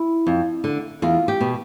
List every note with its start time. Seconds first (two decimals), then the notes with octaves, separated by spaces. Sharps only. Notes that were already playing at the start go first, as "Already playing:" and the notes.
Already playing: E4
0.27 F2
0.64 D3
1.02 E2 F4
1.28 G4
1.41 B2